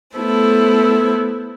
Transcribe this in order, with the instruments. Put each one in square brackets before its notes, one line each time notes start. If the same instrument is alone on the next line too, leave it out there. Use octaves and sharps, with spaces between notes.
[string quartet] A3 B3 E4 A4 C5